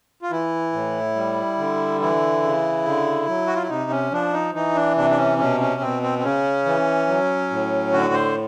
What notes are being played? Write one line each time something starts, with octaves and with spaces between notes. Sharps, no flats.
F4
E3 E4
A2
G3
D3
E3 E4
C#3
D3
F#3
F#4
F4
E4
C3 D#4
C#4
F3 D4
D#4
E3 D#4
D4
C3 D4
D4
C#4
B2 C#4
C#4
B2 C4
C4
C4
C#3 C#4
E3
F#3
A2
D3 F#4
C5